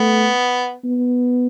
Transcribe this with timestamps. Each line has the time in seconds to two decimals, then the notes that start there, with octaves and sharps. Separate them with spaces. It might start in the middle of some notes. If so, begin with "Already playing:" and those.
Already playing: A3 B3
0.84 B3